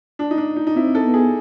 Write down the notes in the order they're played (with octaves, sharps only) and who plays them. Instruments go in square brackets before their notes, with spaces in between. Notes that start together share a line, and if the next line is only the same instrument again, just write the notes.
[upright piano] D4
D#4
D4
D#4
D#4
[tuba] C4 [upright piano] E4
[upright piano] A4
[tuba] B3
[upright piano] G#4